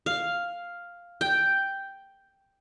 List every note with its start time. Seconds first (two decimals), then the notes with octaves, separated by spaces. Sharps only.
0.06 F5
1.21 G5